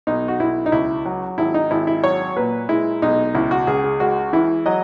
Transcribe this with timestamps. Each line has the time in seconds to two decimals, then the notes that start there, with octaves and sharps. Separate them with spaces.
0.07 B1 D#4
0.28 F#4
0.40 B1 E4
0.66 D#4
0.72 C#2 E4
1.05 F#3
1.38 G#1 E4
1.54 D#4
1.71 G#1 E4
1.87 E4
2.04 F#3 C#5
2.37 A#2 B4
2.69 G#3 E4
3.02 B1 D#4
3.35 C#2 E4
3.51 F#4
3.67 C#2 G#4
3.84 G#4
4.00 G#3 F#4
4.33 E3 E4
4.66 F#3 D#5